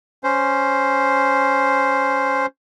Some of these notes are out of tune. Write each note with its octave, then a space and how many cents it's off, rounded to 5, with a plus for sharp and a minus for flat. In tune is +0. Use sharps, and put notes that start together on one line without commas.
C#4 +0 C5 +0